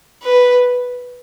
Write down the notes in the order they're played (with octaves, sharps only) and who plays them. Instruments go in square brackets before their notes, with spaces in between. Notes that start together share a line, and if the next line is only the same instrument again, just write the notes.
[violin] B4